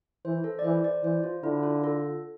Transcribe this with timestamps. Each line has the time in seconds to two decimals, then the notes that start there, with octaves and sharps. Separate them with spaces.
0.25 E3 C5
0.44 A4
0.59 D5
0.64 E3 C5
0.84 D5
1.03 E3 C5
1.24 F4
1.43 D3 E4
1.63 F4
1.84 A4